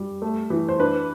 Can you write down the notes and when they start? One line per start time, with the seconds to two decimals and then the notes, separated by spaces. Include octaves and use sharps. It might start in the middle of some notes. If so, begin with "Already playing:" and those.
Already playing: G3
0.22 A3
0.50 E3
0.69 C5
0.79 D4 B4